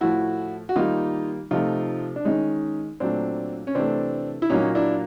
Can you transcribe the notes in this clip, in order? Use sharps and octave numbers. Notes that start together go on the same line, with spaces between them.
A2 F3 A3 E4 F#4
F#4
D#3 G3 A#3 D#4 F4
C3 F3 A3 D#4 F4
D4
D#3 G#3 C#4 D#4
A#2 F#3 A3 C4 D4
C#4
C3 E3 A3 C4 D4
E4
A#2 F#3 A#3 C#4 D#4
D4 E4